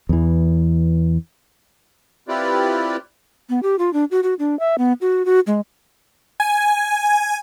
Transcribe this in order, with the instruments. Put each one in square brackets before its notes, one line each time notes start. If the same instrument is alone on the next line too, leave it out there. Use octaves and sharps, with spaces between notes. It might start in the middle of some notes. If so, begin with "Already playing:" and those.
[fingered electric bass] E2 E3
[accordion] C4 E4 F4 G4 B4 D5
[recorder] B3
G4
F4
D4
F#4
F#4
D4
E5
B3
F#4
F#4
G#3
[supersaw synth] G#5